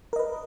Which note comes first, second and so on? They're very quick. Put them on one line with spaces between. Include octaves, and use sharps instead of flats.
A#4 D#5 B4